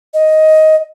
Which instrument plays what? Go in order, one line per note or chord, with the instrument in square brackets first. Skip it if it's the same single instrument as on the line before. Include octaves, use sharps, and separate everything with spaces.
[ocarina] D#5